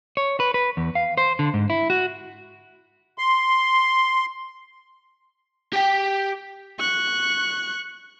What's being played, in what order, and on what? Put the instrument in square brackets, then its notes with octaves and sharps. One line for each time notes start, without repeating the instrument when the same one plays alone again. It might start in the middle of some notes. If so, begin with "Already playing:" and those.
[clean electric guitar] C#5
B4
B4
E2
F5
C5
D3
G#2
E4
F#4
[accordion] C6
[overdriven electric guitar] G4 G5
[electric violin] C#6 F#6